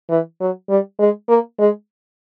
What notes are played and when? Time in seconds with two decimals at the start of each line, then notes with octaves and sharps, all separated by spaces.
0.10 E3
0.40 F#3
0.69 G3
1.00 G#3
1.29 A#3
1.60 G#3